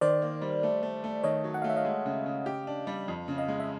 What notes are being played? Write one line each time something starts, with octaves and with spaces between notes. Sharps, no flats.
D#3 C5 D5
A#3
G3
A3
A3
A3
D#3 C#5 D#5
F#3
F#5
A3 F5
E5
D#5 F5
G#3
C#3
C#3
G4
D4
G3
F2
C#3
D#5 F5
G#3
E5